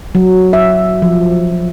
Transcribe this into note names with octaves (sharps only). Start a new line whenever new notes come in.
F#3
E5
F3